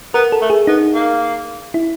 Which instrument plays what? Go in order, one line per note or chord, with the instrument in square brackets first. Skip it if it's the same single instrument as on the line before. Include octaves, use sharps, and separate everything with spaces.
[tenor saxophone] B3 [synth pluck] A#4
[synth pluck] A4
[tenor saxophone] A3
[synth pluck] G#4
[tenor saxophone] B3 [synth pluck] D#4
[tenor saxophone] A#3
[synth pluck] E4